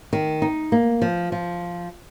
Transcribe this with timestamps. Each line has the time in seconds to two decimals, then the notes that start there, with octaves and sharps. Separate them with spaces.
0.13 D#3
0.42 D#4
0.72 A#3
1.02 F3
1.32 F3